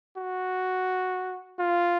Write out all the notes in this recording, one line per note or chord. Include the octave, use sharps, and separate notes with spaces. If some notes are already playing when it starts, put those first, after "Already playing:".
F#4
F4